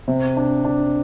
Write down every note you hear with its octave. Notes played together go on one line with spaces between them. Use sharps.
C3
D4
D4